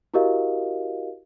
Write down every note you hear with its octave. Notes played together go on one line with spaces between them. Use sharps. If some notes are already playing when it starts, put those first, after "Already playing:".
E4 F#4 G4 A#4 D#5 F5